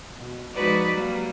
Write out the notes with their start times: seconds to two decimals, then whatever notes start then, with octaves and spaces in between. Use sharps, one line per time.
0.16 B2
0.54 F3 G#3 D#4 F#4 B4 D5
0.91 F#3 G3 A#3